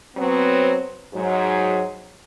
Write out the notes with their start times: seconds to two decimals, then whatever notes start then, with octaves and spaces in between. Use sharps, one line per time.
0.16 F#3 B3 C4
1.14 G#2 F#3